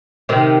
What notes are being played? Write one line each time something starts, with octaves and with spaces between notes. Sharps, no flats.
C3 D#3